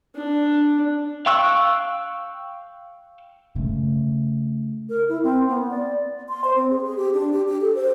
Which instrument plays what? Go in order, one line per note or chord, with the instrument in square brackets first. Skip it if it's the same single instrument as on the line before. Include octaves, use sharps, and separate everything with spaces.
[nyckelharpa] D4
[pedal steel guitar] F5 G5 C#6 E6 F#6
[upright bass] C#3 A3
[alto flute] A#4
E4
C4
B3
D5
C6
C5
C4
G#4
G#4
G4
D4
G4
G4
A4
C5